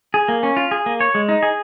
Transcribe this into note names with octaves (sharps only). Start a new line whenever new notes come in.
G#4
A#3
C#4
F4
G#4
A#3
C#5
G#3
D#4
G#4